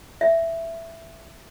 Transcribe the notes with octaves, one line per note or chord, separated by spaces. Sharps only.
E5